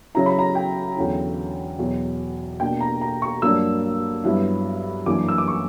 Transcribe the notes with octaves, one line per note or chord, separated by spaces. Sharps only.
C#3 F#3 C#4 E4 A#5
B5
A#5
G5
E2 D3 F#3 C#4 E4
E2 B2 F#3
B2 A#3 D4 G5
A#5
A#5
C#6
G2 F#3 A#3 D4 E6
G2 F#3 B3 E4
F#2 E3 A#3 D4 D6
E6
D6
C#6